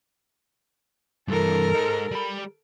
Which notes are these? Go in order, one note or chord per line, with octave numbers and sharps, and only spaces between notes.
G2 E3 A4 A#4
G#3 D#4
G3 B5